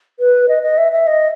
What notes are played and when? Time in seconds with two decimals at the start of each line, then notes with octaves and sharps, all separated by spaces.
0.19 B4
0.48 D#5
0.63 D#5
0.78 E5
0.92 E5
1.07 D#5